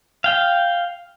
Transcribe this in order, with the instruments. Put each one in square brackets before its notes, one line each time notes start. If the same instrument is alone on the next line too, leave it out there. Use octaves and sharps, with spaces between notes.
[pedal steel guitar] F5 G5